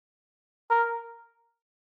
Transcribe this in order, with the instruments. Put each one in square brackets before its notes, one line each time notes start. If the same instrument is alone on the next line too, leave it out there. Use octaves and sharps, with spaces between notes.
[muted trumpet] A#4